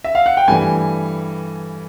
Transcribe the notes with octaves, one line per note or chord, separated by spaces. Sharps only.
E5
F5
F#5
G5
G2 E3 A3 G#5